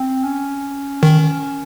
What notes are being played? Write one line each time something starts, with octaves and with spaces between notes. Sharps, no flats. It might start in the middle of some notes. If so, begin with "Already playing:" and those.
Already playing: C4
C#4
D#3